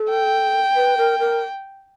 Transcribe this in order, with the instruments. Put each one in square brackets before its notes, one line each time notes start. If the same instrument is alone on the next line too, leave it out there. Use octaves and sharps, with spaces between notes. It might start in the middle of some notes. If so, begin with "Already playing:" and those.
Already playing: [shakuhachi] A4
[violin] G5
[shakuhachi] B4
A#4
A#4